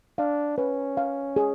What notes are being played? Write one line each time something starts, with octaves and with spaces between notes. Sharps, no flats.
D4 F5
C#4 B4
F5
G#4